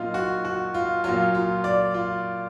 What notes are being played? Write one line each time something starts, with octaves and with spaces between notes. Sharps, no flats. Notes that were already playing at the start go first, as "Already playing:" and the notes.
Already playing: A#2 F#3 D#4 F4
F#4
F#4
F4
A#2 F#3 F4
F4
D5
F4